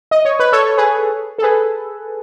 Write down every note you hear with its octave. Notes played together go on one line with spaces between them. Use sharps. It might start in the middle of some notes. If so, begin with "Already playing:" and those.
D#5
C#5
B4
A4 C#5
G#4 B4
A4
G#4 B4